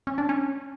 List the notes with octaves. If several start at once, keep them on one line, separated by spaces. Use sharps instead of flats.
C#4
D4
C#4